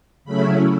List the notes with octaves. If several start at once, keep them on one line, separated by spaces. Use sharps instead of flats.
C#3 F#3 A3 C#4 E4 B5